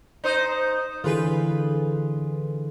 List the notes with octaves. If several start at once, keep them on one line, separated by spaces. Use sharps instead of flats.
D#4 C5 D#5
D3 E3 F4 G#4 B4